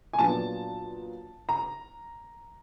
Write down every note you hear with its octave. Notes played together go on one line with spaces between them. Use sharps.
G#5
A#2 F#3 B3 D4 A5
A#5